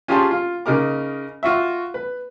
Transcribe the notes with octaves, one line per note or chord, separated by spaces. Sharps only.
C#4 F4 G4 G#4 A5 C6
F4
C#3 D#4 A#4 D6
F4 F#4 E5
B4